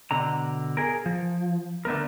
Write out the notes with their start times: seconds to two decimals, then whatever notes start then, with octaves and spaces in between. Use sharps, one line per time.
0.11 B2 D3 A#5
0.77 G#4 A#4
1.06 F3
1.85 D3 A3 B3 A#4